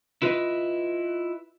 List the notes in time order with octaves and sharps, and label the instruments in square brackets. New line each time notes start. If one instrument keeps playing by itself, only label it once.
[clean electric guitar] E4 F4 B4 D#5 E5